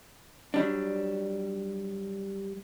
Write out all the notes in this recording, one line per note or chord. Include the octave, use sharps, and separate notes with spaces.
F#3 G3 D4